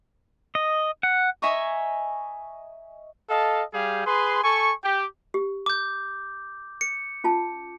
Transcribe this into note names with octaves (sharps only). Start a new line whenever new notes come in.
D#5
F#5
D#5 E5 G#5 A#5 C#6 D#6
A4 D#5 F5 A5
G3 G4 G#4 F5
G#4 B4 C6
A4 G#5 C#6
G4
G4
D6 G6
C#7
C#4 F4 A5